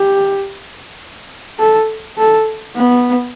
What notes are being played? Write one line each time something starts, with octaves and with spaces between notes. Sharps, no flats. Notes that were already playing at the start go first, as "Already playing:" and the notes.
Already playing: G4
A4
A4
B3